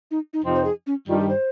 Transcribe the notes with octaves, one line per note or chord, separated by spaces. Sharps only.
D#4
D#4
F2 C3 F3 C4 D#4
C5
G#4
C#4
G2 D#3 G3 F4
G4
C5